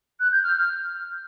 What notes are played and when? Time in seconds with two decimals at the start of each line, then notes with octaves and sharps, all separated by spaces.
0.19 F#6
0.31 G6
0.43 F6
0.55 F6